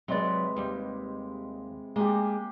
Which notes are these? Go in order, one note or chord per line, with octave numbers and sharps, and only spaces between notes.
C3 F#3 G#3 B4 D5
D#2 G3
G#3 A#3 G4